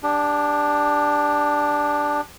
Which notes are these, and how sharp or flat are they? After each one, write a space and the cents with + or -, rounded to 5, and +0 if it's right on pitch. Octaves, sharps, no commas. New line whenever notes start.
D4 +0 G4 +25